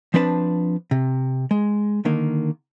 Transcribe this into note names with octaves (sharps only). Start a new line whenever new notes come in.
F3 C4 D4 B4 G5 A5
C3
G#3
D3 D#3 A#3